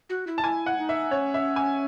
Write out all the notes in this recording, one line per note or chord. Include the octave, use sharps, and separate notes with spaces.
F#4
E4
A5
E4 G#5
F#5
D#4
E5
C#4 C#5
E5
G#5